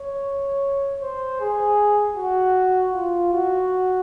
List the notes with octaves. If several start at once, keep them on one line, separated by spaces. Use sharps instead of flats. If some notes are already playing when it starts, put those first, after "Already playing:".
Already playing: C#5
C5
G#4
F#4
F4
F#4